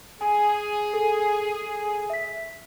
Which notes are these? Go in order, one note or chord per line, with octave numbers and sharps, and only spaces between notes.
G#4 G#5
A4
E5 B6